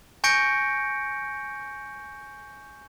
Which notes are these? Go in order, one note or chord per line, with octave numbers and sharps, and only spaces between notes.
G#5 C#6 G6 A#6 C#7 D7